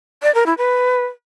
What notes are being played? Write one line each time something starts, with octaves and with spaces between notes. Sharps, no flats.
D5
A#4
E4
B4